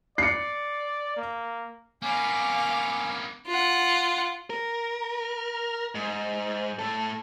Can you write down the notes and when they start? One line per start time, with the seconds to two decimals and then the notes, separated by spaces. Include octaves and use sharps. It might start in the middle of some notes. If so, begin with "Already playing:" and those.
0.18 D5 C7 C#7
1.17 A#3
2.02 A#3 B3 C#4 F5 D6
3.47 F4 F#5
4.50 A#4
5.95 G#2
6.79 A2 A4